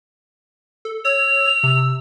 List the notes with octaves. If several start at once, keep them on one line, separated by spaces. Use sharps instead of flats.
A4
C#5 E6 F7
C3